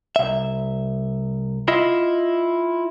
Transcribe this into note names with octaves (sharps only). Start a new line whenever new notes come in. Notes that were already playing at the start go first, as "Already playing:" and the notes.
C2 E5
E4 F4 D#5 E5